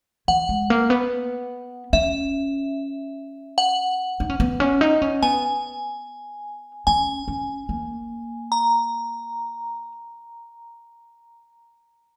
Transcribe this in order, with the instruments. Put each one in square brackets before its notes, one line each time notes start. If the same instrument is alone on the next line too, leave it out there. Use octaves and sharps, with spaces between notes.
[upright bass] E3 [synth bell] F#5
[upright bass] G#3
A#3
B3
[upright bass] C#4 [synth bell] E5
[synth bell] F#5
[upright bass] D#4
C#4
B3
C#4
D#4
C#4
[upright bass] B3 [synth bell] G#5
[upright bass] C#4 [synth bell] G#5
[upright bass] C#4
A#3
[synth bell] A#5